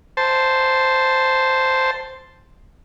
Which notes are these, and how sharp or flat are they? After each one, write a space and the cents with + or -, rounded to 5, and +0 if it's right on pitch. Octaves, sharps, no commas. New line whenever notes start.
C5 +0 A5 +0